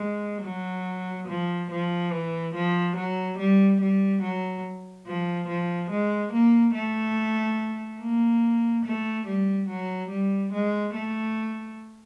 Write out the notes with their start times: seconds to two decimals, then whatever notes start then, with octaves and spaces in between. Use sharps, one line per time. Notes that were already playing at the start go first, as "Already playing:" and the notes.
Already playing: G#3
0.43 F#3
1.28 F3
1.71 F3
2.12 E3
2.54 F3
2.96 F#3
3.38 G3
3.81 G3
4.22 F#3
5.07 F3
5.48 F3
5.91 G#3
6.32 A#3
6.74 A3
8.00 A#3
8.85 A3
9.27 G3
9.68 F#3
10.10 G3
10.53 G#3
10.95 A3